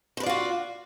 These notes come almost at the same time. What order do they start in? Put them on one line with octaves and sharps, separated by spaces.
C5 B4 D5 F4 F#4